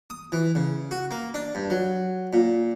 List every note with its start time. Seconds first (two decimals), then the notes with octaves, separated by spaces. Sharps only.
0.10 D#6
0.32 E3
0.55 C#3
0.91 F#4
1.11 A#3
1.34 D4
1.55 G2
1.70 F#3
2.33 A#2